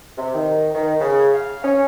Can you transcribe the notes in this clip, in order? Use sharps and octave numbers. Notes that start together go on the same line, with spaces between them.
C3
D#3
D#3
C#3
F5
C#4